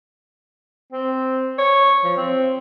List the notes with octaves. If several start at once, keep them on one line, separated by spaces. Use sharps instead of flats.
C4
C#5
F3
C4